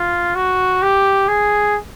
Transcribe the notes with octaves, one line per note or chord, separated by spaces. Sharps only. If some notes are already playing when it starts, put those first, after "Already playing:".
Already playing: F4
F#4
G4
G#4